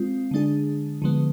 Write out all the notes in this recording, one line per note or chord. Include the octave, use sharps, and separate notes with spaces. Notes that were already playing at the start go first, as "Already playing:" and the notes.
Already playing: G#3 C4 F4
D3 G#3 D4 G#4
D3 F3 G#3 B3